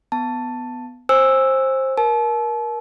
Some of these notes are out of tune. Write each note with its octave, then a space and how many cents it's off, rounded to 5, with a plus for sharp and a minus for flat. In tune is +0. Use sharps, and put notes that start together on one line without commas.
B3 +10 A5 +5
C5 +20 G#5 -20 E6 +0
A#4 +20 A5 -40